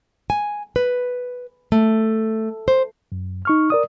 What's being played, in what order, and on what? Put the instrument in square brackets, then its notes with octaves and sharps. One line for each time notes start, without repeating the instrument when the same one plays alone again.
[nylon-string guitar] G#5
B4
A3
C5
[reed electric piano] F#2
D#4 C#6 F6
A#4 D5 D#6